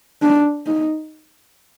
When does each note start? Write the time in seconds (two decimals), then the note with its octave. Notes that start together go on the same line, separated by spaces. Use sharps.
0.22 D4
0.66 D#4